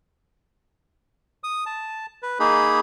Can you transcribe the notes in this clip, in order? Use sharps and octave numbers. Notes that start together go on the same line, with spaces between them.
D#6
A5
B4
A#3 D#4 G#4 B5